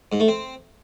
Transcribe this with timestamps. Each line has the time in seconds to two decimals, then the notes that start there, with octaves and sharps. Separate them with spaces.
0.12 G#2
0.20 A3
0.28 C4